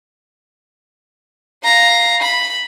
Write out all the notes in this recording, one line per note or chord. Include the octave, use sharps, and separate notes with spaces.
F5 A#5
B5